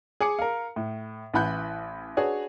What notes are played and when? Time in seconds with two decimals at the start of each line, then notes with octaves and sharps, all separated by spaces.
0.20 G#4 G#5 D6 C#7
0.39 A#4 F5
0.76 A2
1.33 A1 E3 F#5 B5 F#6 G6
2.17 D4 F#4 G#4 B4 C#5